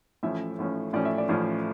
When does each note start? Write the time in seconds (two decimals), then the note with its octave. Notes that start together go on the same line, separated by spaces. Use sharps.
0.23 A1 A2 F3 C#4 E5
0.58 A1 A2 F3 C#4
0.93 A1 A2 F3 C#4 D5
1.05 E5
1.18 D5
1.29 A1 A2 F3 C#4